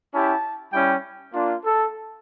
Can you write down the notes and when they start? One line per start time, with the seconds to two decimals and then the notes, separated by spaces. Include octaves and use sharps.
0.13 C#4 E4 G4 A5
0.73 G3 C#4 E4 G5
1.33 A#3 D4 F4
1.64 A4